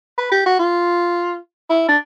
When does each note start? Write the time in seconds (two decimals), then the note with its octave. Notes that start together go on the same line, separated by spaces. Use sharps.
0.18 B4
0.32 G4
0.46 F#4
0.59 F4
1.70 E4
1.88 D4